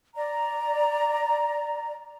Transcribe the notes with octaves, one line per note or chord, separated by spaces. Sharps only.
D5 A#5